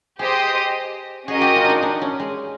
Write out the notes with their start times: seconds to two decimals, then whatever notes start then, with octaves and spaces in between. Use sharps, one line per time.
0.19 G4 G#4 C5 D#5
1.28 C#4 F#4 G#4 A#4 D#5
1.41 G4
1.56 F4
1.64 D4
1.70 D#4
1.83 D4
2.02 C#4
2.20 G#3